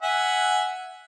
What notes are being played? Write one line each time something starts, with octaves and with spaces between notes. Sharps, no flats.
E5 F#5 G#5